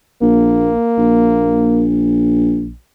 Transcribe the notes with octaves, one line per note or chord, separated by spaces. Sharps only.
A#1 A#3
A#1